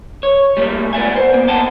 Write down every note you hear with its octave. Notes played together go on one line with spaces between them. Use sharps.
C#5
G3 A3 A#3
B3 D5 E5 G#5
C5
A#3 B3
C5 F#5 G5 A5